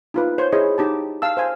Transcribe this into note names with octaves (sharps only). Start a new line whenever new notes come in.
D#4 F4 B4
C5 C#5
E4 G#4 C5 C#5 D#5
D#4 G4 A5
F5 A5 E6
C5 F5 G#5